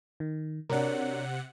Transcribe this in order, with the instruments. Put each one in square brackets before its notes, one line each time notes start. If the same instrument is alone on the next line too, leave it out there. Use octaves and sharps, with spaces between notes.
[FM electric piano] D#3
[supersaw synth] C3 F#5 [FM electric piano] D4 A#4 [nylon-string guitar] F#4 C#5 D5